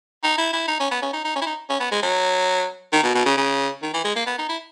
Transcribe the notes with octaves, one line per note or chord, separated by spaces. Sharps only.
D#4
E4
E4
D#4
C#4
B3
C#4
D#4
D#4
C#4
E4
D#4
C#4
B3
G#3
F#3
D#3
B2
B2
C#3
C#3
D#3
E3
G#3
A#3
B3
D#4
E4